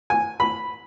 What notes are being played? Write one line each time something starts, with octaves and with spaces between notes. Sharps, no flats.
G#5
B5